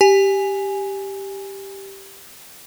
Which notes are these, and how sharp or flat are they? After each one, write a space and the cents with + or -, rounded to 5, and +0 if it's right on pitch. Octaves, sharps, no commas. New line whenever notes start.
G4 +0 G#5 +0